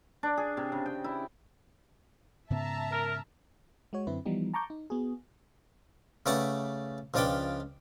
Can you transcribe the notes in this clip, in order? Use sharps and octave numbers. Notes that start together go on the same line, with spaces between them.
D4
G#4
C3
C#3
G5
E4
G#2 C#3 B3 E5 A5 A#5
A#4
G#3 F#4 C#5
F#2 D3 C4 E4 B4
E3 F3 G3 B3 D#4
A5 A#5 C#6 D6 G6
D#4
B3 F#4 G#4
C#3 A3 B4 D5 F#5 A5
C#2 F3 D4 B4 D5 G5